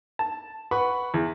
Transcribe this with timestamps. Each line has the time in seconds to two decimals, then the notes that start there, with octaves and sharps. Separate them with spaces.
0.19 A5
0.71 B4 F#5 B5 C#6
1.14 E2